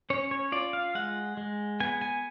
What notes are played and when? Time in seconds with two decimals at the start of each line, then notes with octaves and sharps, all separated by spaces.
0.10 C#4 C#5
0.31 C#5
0.52 F4 D5
0.73 F5
0.95 G#3 F#5
1.37 G#3
1.80 B3 G#5
2.01 G#5